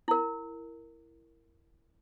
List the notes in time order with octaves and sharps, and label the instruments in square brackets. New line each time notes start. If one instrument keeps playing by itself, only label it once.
[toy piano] E4 A#4